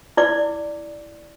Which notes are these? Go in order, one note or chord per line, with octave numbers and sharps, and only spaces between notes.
E4 D5 D6